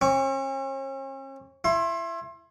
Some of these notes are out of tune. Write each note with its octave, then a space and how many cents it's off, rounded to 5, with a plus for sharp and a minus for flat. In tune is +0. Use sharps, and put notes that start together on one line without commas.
C#4 -45 C#6 +20
E4 +25 C6 +30